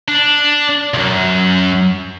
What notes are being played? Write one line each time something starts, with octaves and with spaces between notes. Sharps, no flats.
D4
C2 F#2